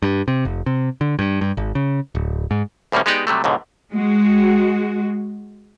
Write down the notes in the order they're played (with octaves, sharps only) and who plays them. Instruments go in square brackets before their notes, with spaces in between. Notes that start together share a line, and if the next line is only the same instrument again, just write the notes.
[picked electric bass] G2
C3
F1
C3
D3
G2
G2
G#1
C#3
D1
G#2
[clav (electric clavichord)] D2 A2 G3 A#3 C#4
G#3 B3 D#4 G4 D5
C3 F#3 G3 A3
C#2 G#2 B2 D3
[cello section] G#3 F#4